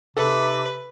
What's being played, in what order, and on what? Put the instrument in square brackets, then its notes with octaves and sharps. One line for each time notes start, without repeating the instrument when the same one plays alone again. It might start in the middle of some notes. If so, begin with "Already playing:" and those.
[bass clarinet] C3 [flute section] D#4 E5 D6 [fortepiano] A4 [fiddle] B4